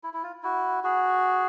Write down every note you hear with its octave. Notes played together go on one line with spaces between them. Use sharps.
E4
E4
F4
E4 F#4
F#4 G#4